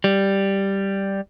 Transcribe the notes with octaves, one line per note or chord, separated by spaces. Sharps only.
G3